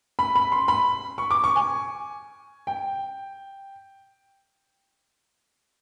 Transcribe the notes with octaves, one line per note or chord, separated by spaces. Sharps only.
B5
B5
C6
B5
C#6
D6
C#6
G#5
G5